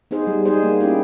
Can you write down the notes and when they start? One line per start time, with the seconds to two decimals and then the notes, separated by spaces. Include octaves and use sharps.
0.11 B3 D#4 G#4 C5
0.27 G3
0.45 B3 D#4 G#4 C5
0.63 A#3
0.81 C#4 E4 G4